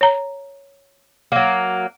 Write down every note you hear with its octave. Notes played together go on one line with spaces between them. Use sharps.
C#5 A#5
F#3 A#3